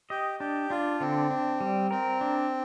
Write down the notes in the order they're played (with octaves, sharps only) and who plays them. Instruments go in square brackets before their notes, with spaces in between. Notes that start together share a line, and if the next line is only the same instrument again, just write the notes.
[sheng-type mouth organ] G4 [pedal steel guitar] D#5
[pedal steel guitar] D4 [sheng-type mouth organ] G4
[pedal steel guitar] D4 [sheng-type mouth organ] F4
[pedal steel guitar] D3 [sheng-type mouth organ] C4
[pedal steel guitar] D4
G3
[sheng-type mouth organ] C4 [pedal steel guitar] A#4
[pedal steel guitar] D4